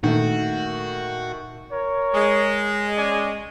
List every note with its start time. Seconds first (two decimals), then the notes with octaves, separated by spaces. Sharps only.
0.04 A#2 D#3 A3 F#4
1.71 A#4 C#5
2.15 G#3
2.98 C#4 D5 G#5